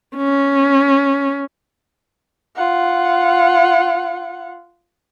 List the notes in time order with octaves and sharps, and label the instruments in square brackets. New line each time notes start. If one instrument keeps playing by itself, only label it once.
[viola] C#4
[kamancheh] F4 F#5